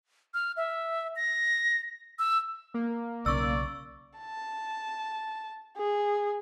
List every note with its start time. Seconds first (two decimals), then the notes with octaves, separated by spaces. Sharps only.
0.34 F6
0.57 E5
1.16 A#6
2.19 E6
2.74 A#3
3.26 B1 C#3 D5 C#6 E6
4.19 A5
5.77 G#4